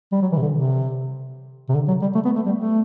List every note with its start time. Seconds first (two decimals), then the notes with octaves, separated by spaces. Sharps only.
0.12 G3
0.22 F#3
0.32 E3
0.37 C3
0.42 D3
0.52 C3
1.69 C3
1.75 D3
1.88 F#3
2.02 G3
2.15 A3
2.25 B3
2.35 A3
2.46 G3
2.56 A3